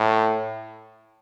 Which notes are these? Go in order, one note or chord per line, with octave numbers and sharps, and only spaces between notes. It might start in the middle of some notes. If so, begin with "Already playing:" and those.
Already playing: A2